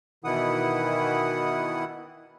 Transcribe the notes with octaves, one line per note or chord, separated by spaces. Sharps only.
B2 D#3 E3 E4 F#5 D#6